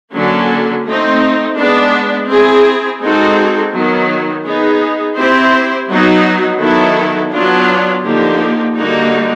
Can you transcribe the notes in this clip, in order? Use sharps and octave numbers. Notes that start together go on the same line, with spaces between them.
D3 F#3 A#3 C#4
A3 C4 D#4
G#3 B3 D4
C4 E4 G#4
G#3 C4 D#4 F#4 A4
D#3 F#3 B3
B3 D#4 G#4
C4 E4 G4 C5
F#3 B3 D#4
D#3 F#3 B3 E4 A4
F#3 B3 D4 F4
D3 F3 A#3 D#4 G4
D3 G3 A#3 D#4 F#4